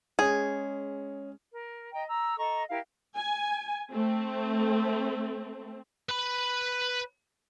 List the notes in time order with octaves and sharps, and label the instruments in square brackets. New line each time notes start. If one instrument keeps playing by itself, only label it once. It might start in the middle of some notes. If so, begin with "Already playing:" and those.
[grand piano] G#3 C#4 [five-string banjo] G#4
[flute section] A#4
D#5 G5 A#5
A#5 E6
A4 D#5 A#5 C#6
E4 G4 A#4 F5
[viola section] G#5
A3 C4
[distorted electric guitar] B4 B5